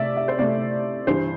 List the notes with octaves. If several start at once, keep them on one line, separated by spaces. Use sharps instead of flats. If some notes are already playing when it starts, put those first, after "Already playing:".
Already playing: C3 A3 D5 E5
E5
C5
C3 A3 D5
G2 E3 G3 C5